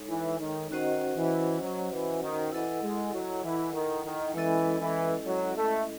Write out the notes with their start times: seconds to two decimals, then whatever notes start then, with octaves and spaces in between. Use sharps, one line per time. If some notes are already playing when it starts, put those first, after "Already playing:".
Already playing: G#3 D#4 A4 C#5
0.09 E3
0.40 D#3
0.70 D#3 C#4 F#4 C5 D#5 F#5
1.16 E3
1.61 F#3
1.92 E3
2.23 D#3
2.52 E3 E4 A4 D#5 F#5
2.83 G#3
3.13 F#3
3.44 E3
3.74 D#3
4.05 D#3
4.34 E3 G#3 C#4 E4 A4 D#5
4.80 E3
5.26 F#3
5.56 A3